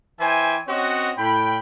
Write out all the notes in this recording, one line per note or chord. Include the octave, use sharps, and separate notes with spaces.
E3 C5 E5 G5 G#5
C4 C#4 F#4 C#5 D#5 F#5
A2 G5 B5